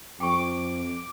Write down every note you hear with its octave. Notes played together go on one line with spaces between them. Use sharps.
F2 G5 C#6 D6